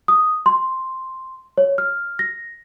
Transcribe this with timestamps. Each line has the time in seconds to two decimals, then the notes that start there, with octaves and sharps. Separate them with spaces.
0.08 D#6
0.46 C6
1.58 C#5
1.78 F6
2.19 A#6